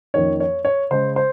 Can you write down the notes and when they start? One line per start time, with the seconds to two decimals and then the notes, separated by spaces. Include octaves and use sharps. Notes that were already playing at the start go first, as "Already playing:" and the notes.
0.14 F2 D#3 A#3 C#4 C#5
0.40 C#5
0.65 C#5
0.91 C#3 G#3 C#4 C5
1.16 C5